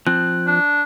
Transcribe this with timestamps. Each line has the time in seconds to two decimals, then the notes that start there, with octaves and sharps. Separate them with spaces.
0.07 F3 C4 F#6
0.47 D4